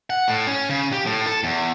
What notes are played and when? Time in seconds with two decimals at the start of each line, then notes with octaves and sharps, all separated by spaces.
0.10 F#5
0.28 A2
0.47 C#4
0.70 C#3
0.93 G4
1.06 A2
1.27 A4
1.43 E2